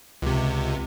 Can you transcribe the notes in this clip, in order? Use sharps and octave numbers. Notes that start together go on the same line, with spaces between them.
C#2 C3